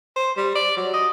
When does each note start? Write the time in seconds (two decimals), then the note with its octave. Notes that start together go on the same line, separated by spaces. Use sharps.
0.16 C5
0.37 G3
0.55 D5
0.77 F#3
0.93 D#5